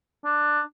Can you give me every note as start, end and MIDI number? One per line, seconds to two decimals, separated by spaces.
0.24 0.61 62